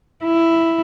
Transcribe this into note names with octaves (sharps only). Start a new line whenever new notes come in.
E4